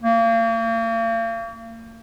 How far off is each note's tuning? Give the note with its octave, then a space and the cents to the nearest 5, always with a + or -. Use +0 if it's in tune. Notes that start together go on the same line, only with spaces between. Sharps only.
A#3 -40